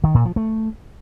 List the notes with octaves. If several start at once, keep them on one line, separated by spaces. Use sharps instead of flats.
D#3
A#2
F3
A3